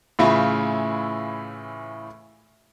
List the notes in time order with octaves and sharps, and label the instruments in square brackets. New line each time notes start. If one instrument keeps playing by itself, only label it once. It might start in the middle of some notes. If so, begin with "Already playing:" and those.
[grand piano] A2 C#3 E3 E4 F4